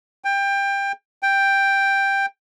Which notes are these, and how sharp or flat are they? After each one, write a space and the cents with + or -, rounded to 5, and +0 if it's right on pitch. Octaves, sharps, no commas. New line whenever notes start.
G5 +20
G5 +5